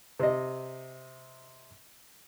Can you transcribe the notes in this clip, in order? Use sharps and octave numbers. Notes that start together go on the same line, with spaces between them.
C3 D#5